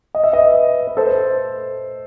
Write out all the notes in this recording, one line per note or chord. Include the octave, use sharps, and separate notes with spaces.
D#5
E5
B4 D#5
B4
A4 C5